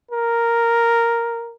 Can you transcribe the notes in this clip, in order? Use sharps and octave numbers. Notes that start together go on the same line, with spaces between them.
A#4